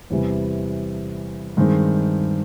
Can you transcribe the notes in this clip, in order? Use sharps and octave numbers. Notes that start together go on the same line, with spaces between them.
E2 C3 E3 G3
G2 D#3 G#3 C4